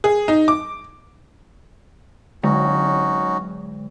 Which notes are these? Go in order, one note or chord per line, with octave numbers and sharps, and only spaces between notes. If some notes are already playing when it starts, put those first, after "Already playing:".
G#4
D#4
D6
D3 F#3 G#3 C#4 D#4 F#4